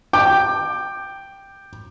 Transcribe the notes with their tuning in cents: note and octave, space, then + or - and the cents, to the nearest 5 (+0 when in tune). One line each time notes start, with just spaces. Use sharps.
G5 +0 D6 +20